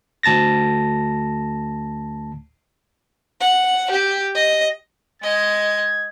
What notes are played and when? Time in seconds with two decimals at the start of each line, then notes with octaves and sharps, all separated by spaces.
0.23 D2 A5 A6 A#6
3.40 F#5
3.90 G4
4.35 D#5
5.22 G#3 D#5 G#6